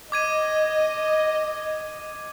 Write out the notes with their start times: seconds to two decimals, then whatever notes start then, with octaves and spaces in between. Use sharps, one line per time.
0.12 D#5 D6 G#6 D#7